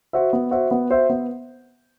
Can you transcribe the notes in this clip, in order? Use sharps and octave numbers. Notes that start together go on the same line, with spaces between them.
F#4 C5 E5
B3
F#4 C5 E5
B3
F#4 C5 E5
B3